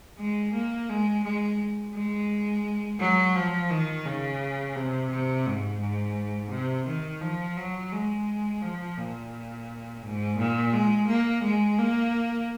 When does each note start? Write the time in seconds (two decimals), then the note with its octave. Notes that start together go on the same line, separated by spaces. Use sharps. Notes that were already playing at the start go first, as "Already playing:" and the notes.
0.19 G#3
0.54 A#3
0.89 G#3
1.24 G#3
1.95 G#3
3.00 F#3
3.35 F3
3.70 D#3
4.05 C#3
4.76 C3
5.11 C3
5.46 G#2
5.80 G#2
6.51 C3
6.87 D#3
7.21 F3
7.57 F#3
7.92 G#3
8.62 F3
8.96 A#2
10.02 G#2
10.38 A#2
10.72 G#3
11.08 A#3
11.43 G#3
11.78 A#3